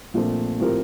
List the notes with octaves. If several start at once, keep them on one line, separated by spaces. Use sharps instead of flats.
A#1 A#2 A3 C4
A2 F3 C4 G4 A#4